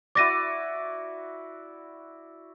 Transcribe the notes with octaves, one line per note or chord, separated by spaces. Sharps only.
E4 F#4 D5 D6 A#6 D#7